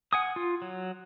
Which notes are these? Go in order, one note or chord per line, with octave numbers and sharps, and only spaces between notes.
F#5 G#5 D#6
F4
F#3